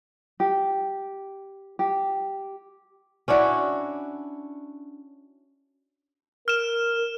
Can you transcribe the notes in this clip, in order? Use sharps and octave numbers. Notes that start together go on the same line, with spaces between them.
G4
G4
C#4 D4 E4 F#4
A#4 F6 E7